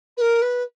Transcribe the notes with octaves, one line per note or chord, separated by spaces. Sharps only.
B4
A#4
B4